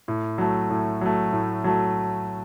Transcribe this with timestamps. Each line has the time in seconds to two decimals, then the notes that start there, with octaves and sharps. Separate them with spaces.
0.08 A2
0.38 F#3 A3
0.70 A2
1.01 F#3 A3
1.33 A2
1.64 F#3 A3